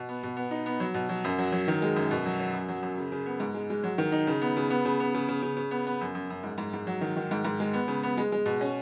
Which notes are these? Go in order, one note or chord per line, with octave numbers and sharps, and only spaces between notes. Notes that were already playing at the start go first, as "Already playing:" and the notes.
Already playing: B2
B3
B2
B3
D#4
B3
F#3
B2
F#3
F#2
F#3
F#3
D#3
G#3
F#2
B2
F#3
F#3
F#2
F#3
F#2
C#3
C#3
B3
G#2
G#3
G#3
F#3
D#3
D#4
C#3
B3
C#3
B3
C#3
B3
C#3
C#3
C#3
C#3
B3
B3
F#2
F#2
F#2
G#2
G#2
G#2
F#3
D#3
D#3
G#2
G#2
G#3
B3
C#3
B3
G#3
G#3
B2
C#4